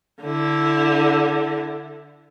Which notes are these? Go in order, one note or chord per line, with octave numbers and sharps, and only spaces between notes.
D3 E4